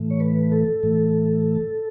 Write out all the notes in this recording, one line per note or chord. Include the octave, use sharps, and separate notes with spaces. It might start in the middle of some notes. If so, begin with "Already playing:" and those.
Already playing: A2 E3 A3
C#5
B4
A4
A2 E3 A3